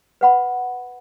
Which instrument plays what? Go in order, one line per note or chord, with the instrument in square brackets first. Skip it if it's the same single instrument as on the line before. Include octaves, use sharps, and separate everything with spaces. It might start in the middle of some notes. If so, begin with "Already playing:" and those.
[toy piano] B4 F#5 B5